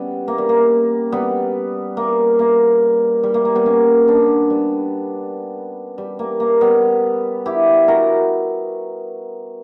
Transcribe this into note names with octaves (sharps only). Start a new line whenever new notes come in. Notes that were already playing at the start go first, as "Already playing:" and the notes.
Already playing: G3 B3 C#4
A#3
G3
A#3
G3 B3
A#3
A#3
G3
A#3
A#3
G3 B3
A#3 C#4
B3 D4
G3 B3
G3
A#3
A#3
G3 B3
E4 G4
F#4 A#4